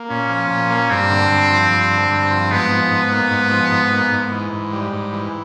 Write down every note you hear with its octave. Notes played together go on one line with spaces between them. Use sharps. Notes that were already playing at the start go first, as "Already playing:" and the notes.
Already playing: A#3
A#2 C#4
F3
A#2
A#3
G2 C4
D3
G2
F3
G2
D3
G2
F3
G#2 B3
F3
G#2
A#3
G#2
F3
G#2
A#3
G#2
E3
G#2
G3
G#2
E3